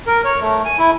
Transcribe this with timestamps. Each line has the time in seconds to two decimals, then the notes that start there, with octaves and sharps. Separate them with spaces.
0.07 A#4
0.25 C#5
0.41 A3
0.65 G#5
0.79 E4